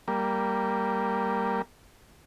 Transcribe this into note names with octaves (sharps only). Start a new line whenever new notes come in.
G3 A#3